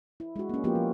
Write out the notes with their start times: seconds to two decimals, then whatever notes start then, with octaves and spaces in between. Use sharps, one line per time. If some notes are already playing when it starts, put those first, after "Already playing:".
0.20 E4
0.36 G#3 D4 F#4
0.49 A#3 C#4
0.64 F3 A#3 B3 C#4 F4 G4
0.75 F3